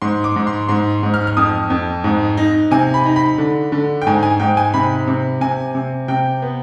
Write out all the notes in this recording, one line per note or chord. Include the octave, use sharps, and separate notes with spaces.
G#2 C6
D6
G#2
C6
G#2 C6
G#2
F6
F6
F2 D#6
F2
G#2
D#4
C3 G#5
B5
D#4
B5
D3
D3
G5
G#2 G#5
G#5
G#2 G5
G#5
C3 B5
C3
C3 G#5
C3
C3 G5
B3